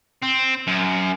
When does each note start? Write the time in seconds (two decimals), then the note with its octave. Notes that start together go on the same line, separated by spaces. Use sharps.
0.23 C4
0.68 F#2